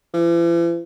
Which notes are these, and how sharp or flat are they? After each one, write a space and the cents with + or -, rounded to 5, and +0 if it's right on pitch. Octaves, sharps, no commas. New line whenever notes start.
E3 +45